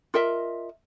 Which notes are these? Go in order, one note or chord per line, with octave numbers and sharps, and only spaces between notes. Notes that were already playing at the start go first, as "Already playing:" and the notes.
F4 A#4 D#5 E5